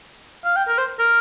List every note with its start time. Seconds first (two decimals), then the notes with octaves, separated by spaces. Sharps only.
0.45 F5
0.56 G5
0.68 A#4
0.78 C5
0.99 A#4